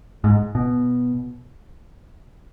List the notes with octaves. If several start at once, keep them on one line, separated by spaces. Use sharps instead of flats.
G#2
B2